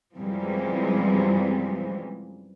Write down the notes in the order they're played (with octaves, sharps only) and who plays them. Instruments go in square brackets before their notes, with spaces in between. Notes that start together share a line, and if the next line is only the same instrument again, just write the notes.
[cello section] F#2 C3 E3 F3 G3 G#3